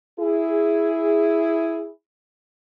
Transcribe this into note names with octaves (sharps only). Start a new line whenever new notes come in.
E4 G#4